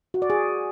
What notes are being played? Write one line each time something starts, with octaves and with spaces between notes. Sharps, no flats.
F#4
D5
G#4